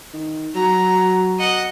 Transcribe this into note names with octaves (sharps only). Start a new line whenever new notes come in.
D#3
F#3 A#5
D#5 F#5